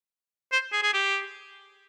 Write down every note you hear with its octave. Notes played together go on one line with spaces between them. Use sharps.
C5
G#4
G#4
G4